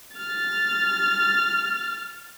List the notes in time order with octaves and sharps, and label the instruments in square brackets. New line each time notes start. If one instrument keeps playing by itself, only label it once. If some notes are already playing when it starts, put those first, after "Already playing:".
[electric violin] F6 A6